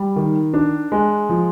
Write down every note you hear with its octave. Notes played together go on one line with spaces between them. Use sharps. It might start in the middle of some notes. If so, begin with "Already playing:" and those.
Already playing: G3
D#3
D4
G#3
F3